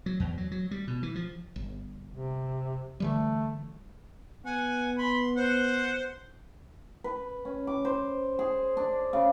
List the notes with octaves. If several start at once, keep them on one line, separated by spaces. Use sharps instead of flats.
F#3
E2
F#3
F#3
G3
B2
E3
F3
G1
C3
D3 E3 G3 A3
B3 F#5 G#5
B5 C6
C5 F#5
B4
C#4
D6
C5
G#4
D4
C#3